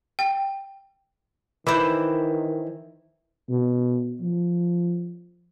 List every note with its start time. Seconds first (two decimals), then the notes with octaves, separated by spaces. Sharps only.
0.19 G5
1.67 D#3 E3 C5 B5 D6
3.50 B2
4.22 F3